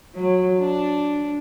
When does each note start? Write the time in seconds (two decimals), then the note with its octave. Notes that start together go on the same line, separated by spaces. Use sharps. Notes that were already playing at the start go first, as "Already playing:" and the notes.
0.15 F#3
0.59 D4